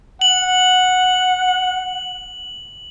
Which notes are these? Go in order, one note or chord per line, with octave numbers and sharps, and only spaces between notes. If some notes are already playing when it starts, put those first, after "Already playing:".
F#5 F#7